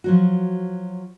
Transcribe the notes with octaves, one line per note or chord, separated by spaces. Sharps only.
F3 F#3 F#4